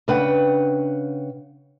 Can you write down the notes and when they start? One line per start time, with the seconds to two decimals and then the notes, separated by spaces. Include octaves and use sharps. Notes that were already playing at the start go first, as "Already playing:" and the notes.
0.08 C#3 D4 B4 F#5 G5